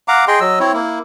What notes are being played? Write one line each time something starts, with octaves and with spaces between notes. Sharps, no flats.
F5 F#5 A#5 D6
G#4 D#5 G5 C6
F#3 D#5 E6
C4 E4 C#5
A#3 E4